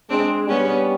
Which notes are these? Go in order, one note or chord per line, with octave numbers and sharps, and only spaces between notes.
G#3 C4 D4
G3 B3 C#4